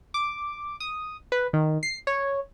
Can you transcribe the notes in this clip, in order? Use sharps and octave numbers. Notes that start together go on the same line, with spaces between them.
D6
D#6
B4
D#3
C7
C#5